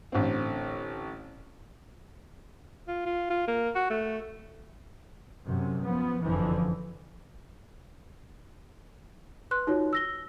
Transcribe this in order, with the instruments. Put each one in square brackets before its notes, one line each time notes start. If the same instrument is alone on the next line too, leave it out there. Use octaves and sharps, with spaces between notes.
[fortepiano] A1 D3 C4
[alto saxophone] F4
F4
F4
A#3
F#4
A3
[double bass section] F#2 C3
F3 B3
F#1 F2 D3 E3 F3
[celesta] B4 C6 F#6
D#4 F4 F#4 C#5
E6 A#6 G7